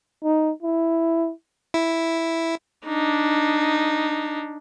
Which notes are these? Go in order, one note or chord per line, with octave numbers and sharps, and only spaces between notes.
D#4
E4
E4
D4 D#4